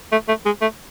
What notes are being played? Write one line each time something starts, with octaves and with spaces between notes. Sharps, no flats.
A3
A3
G#3
A3